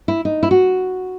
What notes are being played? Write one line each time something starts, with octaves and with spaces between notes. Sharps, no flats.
E4
D#4
E4
F#4